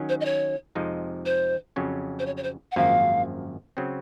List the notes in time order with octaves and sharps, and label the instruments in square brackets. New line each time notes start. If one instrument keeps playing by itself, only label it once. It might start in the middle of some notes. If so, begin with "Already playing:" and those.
Already playing: [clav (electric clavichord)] D#3 F#3 C#4
[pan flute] C5
D#5
C#5
[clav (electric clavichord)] F2 C3 F3 G#3 D#4
[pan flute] C5
[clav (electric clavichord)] F2 C#3 F#3 C#4
[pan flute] C5
C#5
C#5
C5
F#5
[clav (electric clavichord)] G#1 F#2 F3 A#3 [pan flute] F5
[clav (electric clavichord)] C#3 F#3 C4